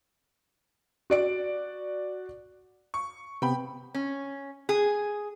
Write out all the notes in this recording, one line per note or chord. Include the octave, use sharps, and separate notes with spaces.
F#4 D5 D7
C#6
C3 B3 G5 B5
C#4
G#4